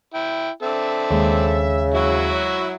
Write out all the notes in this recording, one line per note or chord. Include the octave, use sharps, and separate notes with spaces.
E4 G5
C4 D4 A4 E5
D#2 C#3 G#3
F#3 E4 F#4 E5